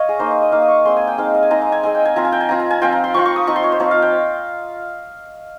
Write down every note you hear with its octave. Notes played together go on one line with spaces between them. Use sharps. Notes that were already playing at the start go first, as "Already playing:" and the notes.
Already playing: C#5 D#5 F5
G#4
A#3 D#4 C5
C5
D#5
A#3 D#4 F5
D#6
C#6
G#3 C4 D#4 C6
G#5
G5
G#3 C4 D#4 F5
F5
G#5
G#3 C4 D#4 A#5
A#5
G#5
G#3 C4 D#4 G#5
G5
G#5
F3 C4 F4 A#5
G#5
G5
G#5
F3 C4 F4 A#5
A#5
G#5
F3 C4 F4 G5
A#5
C6
F3 C4 F4 C#6
C#6
D#6
F3 C4 D#4 C#6
C6
C#5
C5
F3 C4 D#4 C#5
F5
G5